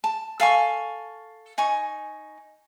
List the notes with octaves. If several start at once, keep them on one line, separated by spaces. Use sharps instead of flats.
A5
A4 F5 G#5 C#6
D#4 G#5 C#6